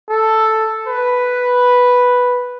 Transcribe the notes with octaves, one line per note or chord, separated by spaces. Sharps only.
A4
B4